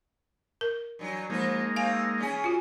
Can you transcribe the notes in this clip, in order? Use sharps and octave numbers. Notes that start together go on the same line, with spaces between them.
A#4
G2 E3 F#3
F3 G#3 A#3 D#4 B4
A3 C4 F5 G#5
E3 C#4 G#4
F4 F#4